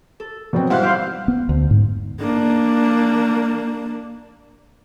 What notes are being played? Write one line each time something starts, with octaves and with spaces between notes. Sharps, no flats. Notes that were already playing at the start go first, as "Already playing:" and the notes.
A4
B2 F#3 C4
G#2 G3 E4 B4 C5 F5 F#5 F#6
G3 G4 B4 C5 E5 F5
B3
D2
G#2
A#3 D4